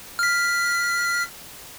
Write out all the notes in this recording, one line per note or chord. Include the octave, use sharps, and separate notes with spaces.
F6 B6